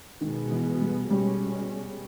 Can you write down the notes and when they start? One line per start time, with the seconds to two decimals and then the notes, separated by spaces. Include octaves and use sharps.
0.21 B2 D#3 G#3 B3
0.51 E3
0.81 G3
1.10 B2 G3 G#3 C#4